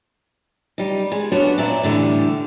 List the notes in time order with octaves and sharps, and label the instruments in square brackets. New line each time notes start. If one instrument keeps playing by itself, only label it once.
[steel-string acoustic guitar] G3 D#4
G#3
B3 D4 F#4 C#5
A#2 F#3 D5 E5 A#5
A2 D3 E3 G3